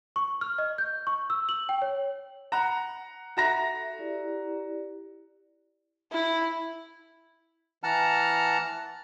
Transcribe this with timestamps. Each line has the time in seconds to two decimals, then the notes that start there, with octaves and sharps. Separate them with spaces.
0.16 C#6
0.41 F6
0.58 D#5
0.78 G6
1.07 C#6
1.30 E6
1.49 F#7
1.69 G5
1.82 C#5
2.52 F#5 A#5
3.37 F#4 A4 E5 A#5 A#6
3.99 E4 G4 D5
6.12 E4
7.83 E3 F#5 A5 A#5 F6